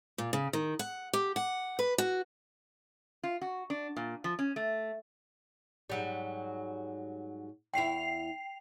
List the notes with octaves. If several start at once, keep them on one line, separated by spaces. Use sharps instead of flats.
A#2
C#3
D#3
F#5
G4
F#5
B4
F#4
F4
F#4
D4
A#2
F3
C#4
A3
G#2 F#3 G3
E2 E4 G5 C7 F7